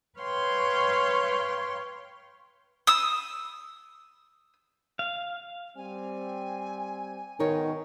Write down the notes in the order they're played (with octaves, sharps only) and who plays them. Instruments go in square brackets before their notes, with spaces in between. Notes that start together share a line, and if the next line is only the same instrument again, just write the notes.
[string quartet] B4 C#5 F5 G5 C6
[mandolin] D#6 E6
[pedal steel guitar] F5
[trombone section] G3 C4 [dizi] G#5
[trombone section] G#2 B2 [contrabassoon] D#3 [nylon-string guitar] A#4 C#5